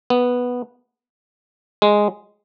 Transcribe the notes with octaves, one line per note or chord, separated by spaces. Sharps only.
B3
G#3